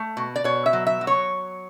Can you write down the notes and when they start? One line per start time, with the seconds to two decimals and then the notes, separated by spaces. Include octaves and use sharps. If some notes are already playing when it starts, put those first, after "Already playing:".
Already playing: A3
0.17 B2
0.36 D5
0.44 B2 C#5
0.66 E5
0.73 F#3
0.87 E5
1.01 F#3
1.07 C#5